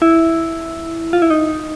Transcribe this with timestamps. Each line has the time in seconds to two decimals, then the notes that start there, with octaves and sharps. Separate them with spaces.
0.02 E4
1.13 F4
1.22 E4
1.30 D#4